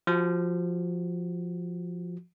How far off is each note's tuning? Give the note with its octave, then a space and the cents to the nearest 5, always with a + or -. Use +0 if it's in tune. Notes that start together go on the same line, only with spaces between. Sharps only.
F3 +0 F#4 +15